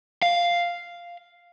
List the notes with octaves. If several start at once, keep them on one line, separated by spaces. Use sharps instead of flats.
F5